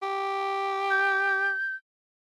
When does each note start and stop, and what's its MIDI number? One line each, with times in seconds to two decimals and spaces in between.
0.02 1.51 67
0.90 1.75 91